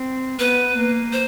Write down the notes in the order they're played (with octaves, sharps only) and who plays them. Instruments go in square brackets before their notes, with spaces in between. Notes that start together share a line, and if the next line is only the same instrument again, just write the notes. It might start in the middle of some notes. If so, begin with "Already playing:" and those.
Already playing: [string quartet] C4
[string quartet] B3 [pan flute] B4
[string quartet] A#3
[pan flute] C5